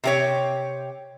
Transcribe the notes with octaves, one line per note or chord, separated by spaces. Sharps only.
C3 G4 C#5